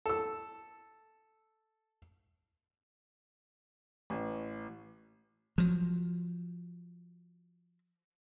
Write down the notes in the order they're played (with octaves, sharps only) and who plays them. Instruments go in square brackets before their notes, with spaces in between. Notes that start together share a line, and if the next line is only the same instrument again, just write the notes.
[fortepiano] A4 E6
[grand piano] A1
[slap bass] F3 F#3